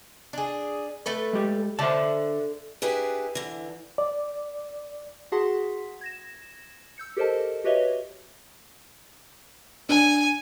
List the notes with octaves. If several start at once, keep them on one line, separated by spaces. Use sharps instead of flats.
D4 G#4
A3 A4 B4
G#3 G4
D3 C5 E5 A5
D4 E4 G4 G#4 B4
D3 E3
D5
F#4 G#4 F#5 A5 C6 B6
G#6 A#6 E7
E6 G6 C#7
G4 A4 A#4 C5 D#5 A5
F#4 G4 B4 C#5 D#5 E5
D4 G#5